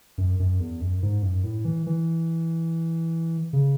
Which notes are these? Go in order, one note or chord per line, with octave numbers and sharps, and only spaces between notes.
F#2
F#2
E2
F#2
G#2
F#2
A2
E3
E3
C#3